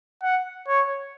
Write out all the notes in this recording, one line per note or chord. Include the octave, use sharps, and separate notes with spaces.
F#5
C#5